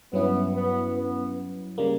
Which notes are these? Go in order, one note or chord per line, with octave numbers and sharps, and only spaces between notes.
G2 F#3 B3 C#4 E4
B3
B3
C#3 G3 A#3